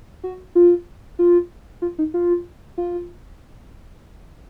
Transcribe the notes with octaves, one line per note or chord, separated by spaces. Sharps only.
F#4
F4
F4
F4
D#4
F4
F4